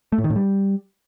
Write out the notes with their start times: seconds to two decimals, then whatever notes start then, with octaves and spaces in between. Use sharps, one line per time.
0.12 A3
0.18 A2
0.24 D#3
0.30 A2
0.36 G3